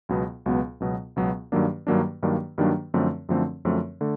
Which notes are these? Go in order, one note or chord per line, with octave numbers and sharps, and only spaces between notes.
C#2 B2 F#3 B3
C#2 B2 F#3 B3
C#2 B2 F#3 B3
C#2 B2 F#3 B3
G2 D#3 F#3 A#3 D4
G2 D#3 F#3 A#3 D4
G2 D#3 F#3 A#3 D4
G2 D#3 F#3 A#3 D4
F#2 D3 F3 A3 C4
F#2 D3 F3 A3 C4
F#2 D3 F3 A3 C4
D3 A3